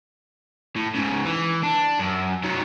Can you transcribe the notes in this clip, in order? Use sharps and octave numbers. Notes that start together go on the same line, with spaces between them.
A2
G#2 C#3
E3
D4
F#2
D#3 F#3